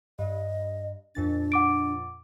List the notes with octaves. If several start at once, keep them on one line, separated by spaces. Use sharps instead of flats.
G2 D#5
F2 A#2 D4 A6
F#5 D6 D7